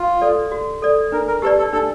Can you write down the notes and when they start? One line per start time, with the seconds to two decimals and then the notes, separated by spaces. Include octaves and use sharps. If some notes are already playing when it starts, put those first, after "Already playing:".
Already playing: F4
0.21 A4 D5
0.52 F#4
0.82 A4 D5
1.12 D4 A#4
1.28 A#4
1.42 G4 A4 B4 D5
1.58 A4
1.73 D4 A4